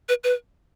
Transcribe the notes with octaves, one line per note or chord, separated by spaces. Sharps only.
B4
B4